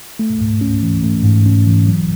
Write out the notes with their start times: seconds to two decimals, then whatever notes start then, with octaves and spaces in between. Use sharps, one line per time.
0.19 A3
0.41 G#2
0.61 C#4
0.83 E3
1.04 A3
1.24 G#2
1.46 C#4
1.67 E3
1.87 F#3